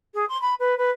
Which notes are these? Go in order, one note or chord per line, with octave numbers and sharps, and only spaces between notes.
G#4
C6
B5
B4
B4